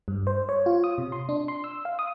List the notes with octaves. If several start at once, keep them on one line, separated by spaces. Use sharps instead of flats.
G2
C5
C#5
F4
D#6
C3
C6
D4
C6
E6
F5
D#6